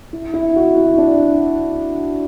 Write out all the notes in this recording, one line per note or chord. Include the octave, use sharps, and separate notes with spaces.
E4
E4
F#4
E4
D4